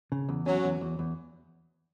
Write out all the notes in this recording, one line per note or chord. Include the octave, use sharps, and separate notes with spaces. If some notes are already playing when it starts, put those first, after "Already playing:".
C#3
E2
F#3 C#4
E2
E2
E2